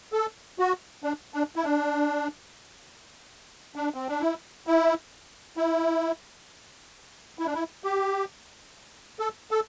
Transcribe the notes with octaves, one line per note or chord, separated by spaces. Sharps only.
A4
F#4
D4
D4
E4
D4
D4
C4
D4
E4
E4
E4
E4
D4
E4
G4
A4
A4